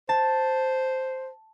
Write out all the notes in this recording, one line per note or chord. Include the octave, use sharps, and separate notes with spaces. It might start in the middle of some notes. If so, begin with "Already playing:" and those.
C5 A5